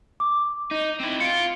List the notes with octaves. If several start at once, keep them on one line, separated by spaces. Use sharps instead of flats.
D6
D#4
C4 E4
F4 C#7 D7